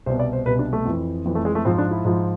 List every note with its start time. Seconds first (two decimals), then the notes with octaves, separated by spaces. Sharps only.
0.06 C2 B2 C5
0.19 D5
0.33 C5
0.46 C2 B2 B4
0.59 D4
0.73 A3
0.85 F2 E3
1.25 F2 E3
1.35 A3
1.45 G#3
1.55 A3
1.65 G#2 F3 C4
1.78 D4
1.91 E4
2.04 G#2 F3